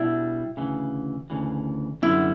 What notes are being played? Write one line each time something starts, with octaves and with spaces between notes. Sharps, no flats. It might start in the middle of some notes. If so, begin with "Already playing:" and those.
Already playing: B2 G3 D4 E4
D2 C#3 E3
D2 C#3 E3
F#2 D3 G3 B3 E4